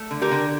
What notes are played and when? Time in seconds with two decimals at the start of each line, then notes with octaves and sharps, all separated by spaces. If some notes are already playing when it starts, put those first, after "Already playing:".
Already playing: A3
0.11 D3
0.22 G4 A#4
0.31 D3